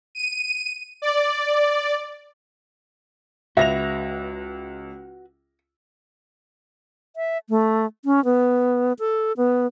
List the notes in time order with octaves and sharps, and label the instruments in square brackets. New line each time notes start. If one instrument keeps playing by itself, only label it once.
[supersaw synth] D#7
D5
[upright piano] C#2 A#6 F7 [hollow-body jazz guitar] F#4 B4 [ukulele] E5
[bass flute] E5
A3
C#4
B3
A4
B3